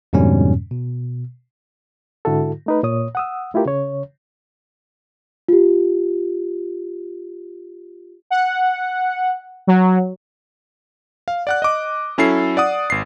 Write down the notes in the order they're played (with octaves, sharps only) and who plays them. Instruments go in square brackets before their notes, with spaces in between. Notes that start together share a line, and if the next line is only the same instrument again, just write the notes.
[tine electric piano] F2 G#2 B2 D3 G3 C#4
B2
[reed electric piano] G#2 D3 E4 F#4 A4
A3 D#4 B4
A#2 C#5 D#6
F#5 D#6 E6
A3 E4 F4 G4 A#4
C#3 C#5
[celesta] F4 G4
[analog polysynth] F#5
F#3
[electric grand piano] F5
D5 F#5 F#6
D#5 D6
F#3 C#4 E4 A4 C7
D5 F#5 D#6
G#1 C7